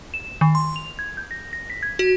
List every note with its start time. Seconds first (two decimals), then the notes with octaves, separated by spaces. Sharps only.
0.14 E7
0.41 D#3
0.55 C6
0.76 F7
0.99 G#6
1.17 G6
1.31 A#6
1.53 A#6
1.70 B6
1.83 G#6
1.99 F#4